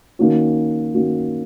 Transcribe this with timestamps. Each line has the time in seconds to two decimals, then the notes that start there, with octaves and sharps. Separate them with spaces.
0.19 D#3 A#3 C#4 F#4
0.95 D#3 A#3 C#4 F#4